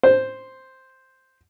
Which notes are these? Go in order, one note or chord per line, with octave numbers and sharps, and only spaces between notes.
C5